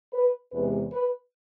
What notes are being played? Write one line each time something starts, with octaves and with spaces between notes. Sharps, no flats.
B4
E2 C3 G#3 B4
B4